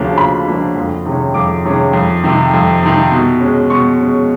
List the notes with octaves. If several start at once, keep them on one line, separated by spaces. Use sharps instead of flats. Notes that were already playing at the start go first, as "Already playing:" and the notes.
Already playing: D2 C#3 F3 A#3 D4
D2 B5
C#3 F3 A#3 D4
F2
C3 D#3 G#3 C#4
F2 D6
C3 D#3 G#3 C#4
F2
C3 D#3
F2
C3 D#3
B2
G#3 C#4
B2 C#6
G#3 C#4